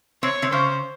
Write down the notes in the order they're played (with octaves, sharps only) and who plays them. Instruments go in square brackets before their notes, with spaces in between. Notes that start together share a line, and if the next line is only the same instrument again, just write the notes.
[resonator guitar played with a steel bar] C3 C4 [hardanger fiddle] C#5
[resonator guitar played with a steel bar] C3 C4
[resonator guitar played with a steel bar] C#3 C#4 [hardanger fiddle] C5